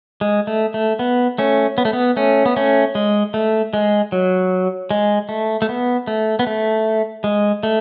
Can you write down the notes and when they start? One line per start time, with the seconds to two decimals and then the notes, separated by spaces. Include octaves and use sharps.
0.21 G#3
0.47 A3
0.74 A3
0.99 B3
1.38 A3 C#4
1.78 B3
1.85 A3
1.93 B3
2.17 A3 C#4
2.46 B3
2.56 A3 C#4
2.95 G#3
3.34 A3
3.73 G#3
4.12 F#3
4.91 G#3
5.29 A3
5.62 A3
5.69 B3
6.07 A3
6.39 B3
6.47 A3
7.24 G#3
7.63 A3